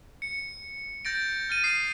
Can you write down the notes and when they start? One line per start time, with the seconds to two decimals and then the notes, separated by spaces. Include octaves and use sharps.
0.22 C#7
1.05 G6 A6 A#6 D7
1.49 F6 A6 D#7
1.64 D#6 C7